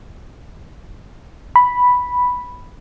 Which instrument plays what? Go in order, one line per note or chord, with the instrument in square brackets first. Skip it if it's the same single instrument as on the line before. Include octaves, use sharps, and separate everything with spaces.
[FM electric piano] B5